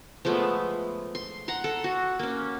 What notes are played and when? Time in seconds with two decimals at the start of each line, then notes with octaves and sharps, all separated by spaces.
0.25 F3 G#3 A3 B3
1.15 C6
1.48 F#5 A#5 C6
1.64 A4
1.84 F#4
2.19 A#3 C#4